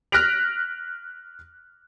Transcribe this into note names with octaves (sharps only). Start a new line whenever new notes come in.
F6 F#6 A#6 B6 D7 F7